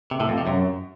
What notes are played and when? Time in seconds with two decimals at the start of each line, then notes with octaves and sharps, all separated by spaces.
0.11 C3
0.20 A2
0.29 F2
0.38 C3
0.47 F#2